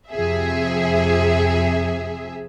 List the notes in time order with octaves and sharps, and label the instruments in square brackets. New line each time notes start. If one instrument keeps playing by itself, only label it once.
[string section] F2 C3 G#4 E5